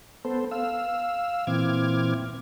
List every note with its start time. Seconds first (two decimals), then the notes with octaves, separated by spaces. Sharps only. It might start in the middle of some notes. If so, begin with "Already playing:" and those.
0.25 B3 A4 C5
0.51 F5 E6
1.47 A#2 E3 C4 D6 F6 G#6